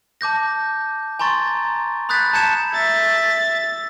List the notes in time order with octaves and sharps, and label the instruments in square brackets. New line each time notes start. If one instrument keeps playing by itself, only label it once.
[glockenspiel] A5 D6 G6 A#6
G#5 A#5 C6 C#6 A6
B5 D#6 F#6 G6 A6 B6
A5 A#5 G6 G#6 C#7 E7
[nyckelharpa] E5 [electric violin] A6